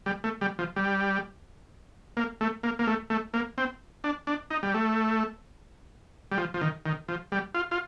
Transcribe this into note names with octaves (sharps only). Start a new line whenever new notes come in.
G3
A3
G3
F3
G3
A#3
A3
A#3
A#3
A3
A3
A#3
C4
D4
D4
D#4
G3
A3
G3
F3
F3
D#3
D#3
F3
G3
F4
F4